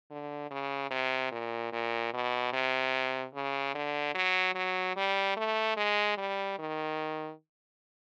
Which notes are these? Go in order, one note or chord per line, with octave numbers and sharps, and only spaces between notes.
D3
C#3
C3
A#2
A#2
B2
C3
C#3
D3
F#3
F#3
G3
A3
G#3
G3
D#3